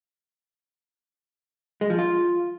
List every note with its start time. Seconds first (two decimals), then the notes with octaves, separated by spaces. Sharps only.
1.81 G#3
1.90 F3
1.99 F4